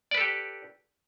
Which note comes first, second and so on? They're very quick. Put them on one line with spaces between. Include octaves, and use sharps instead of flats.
D5 B4 A4 G4